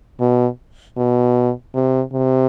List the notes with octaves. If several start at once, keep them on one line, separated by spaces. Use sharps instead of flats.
B2
B2
C3
C3